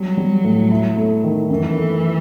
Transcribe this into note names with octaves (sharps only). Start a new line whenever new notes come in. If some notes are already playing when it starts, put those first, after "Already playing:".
Already playing: F#3 G3
G3
A2
E4
A3
D#3
F#2 E3
A3